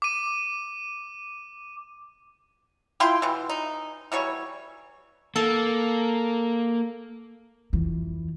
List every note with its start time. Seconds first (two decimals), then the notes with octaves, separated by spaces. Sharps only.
0.02 D6 D#7
3.00 E4 F4 G5 C6
3.22 B2 E3
3.49 D#4
4.12 E3 F#3 G3 C#5
5.36 A#3 A4
7.73 F2 E3